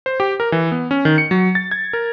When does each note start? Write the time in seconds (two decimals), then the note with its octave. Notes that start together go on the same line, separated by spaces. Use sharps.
0.06 C5
0.20 G4
0.40 A#4
0.52 E3
0.72 B3
0.91 C#4
1.05 D#3
1.18 C#7
1.31 F#3
1.55 A6
1.71 G#6
1.93 A#4